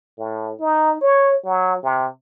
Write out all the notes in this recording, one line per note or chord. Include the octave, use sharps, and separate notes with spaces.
A2
D#4
C#5
F#3
C3